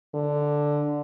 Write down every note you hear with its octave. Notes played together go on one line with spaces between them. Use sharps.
D3